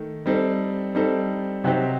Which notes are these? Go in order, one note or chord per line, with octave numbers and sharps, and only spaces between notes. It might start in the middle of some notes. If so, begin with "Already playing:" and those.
Already playing: D#3 A3
G3 C4 D#4 A4
G3 C4 D#4 A4
C3 F#3 C4 D#4 G4